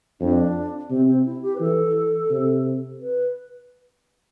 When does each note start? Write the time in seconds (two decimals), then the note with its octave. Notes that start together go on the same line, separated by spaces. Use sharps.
0.20 F2 D4
0.89 C3 C4
1.07 C4
1.26 E4
1.42 G4
1.56 B4
1.60 E3 A4
2.30 C3
3.01 B4